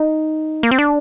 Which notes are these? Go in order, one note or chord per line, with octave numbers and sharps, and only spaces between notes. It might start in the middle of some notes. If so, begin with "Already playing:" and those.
Already playing: D#4
A#3
C4
D4